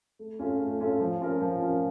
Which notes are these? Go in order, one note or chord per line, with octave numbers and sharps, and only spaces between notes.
A3
C#4 F4 A4
A3
C#4 F4 A4
F3
C#4 F4 A#4
F3
C#4 F4 A#4